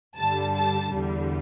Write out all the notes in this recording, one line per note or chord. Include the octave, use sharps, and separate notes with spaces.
G2 D3 G3 A5
A5
E2 D3 G3